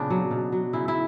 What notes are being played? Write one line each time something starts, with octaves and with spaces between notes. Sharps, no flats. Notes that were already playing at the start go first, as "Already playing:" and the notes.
Already playing: A#2 C#3 B3 D4
F#3
B2
F#3
C#3 E4
E4